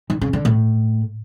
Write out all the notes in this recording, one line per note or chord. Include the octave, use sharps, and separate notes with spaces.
D#3
C#3
D3
A2